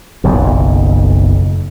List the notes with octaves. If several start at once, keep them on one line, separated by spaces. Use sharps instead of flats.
F#1 B1 F2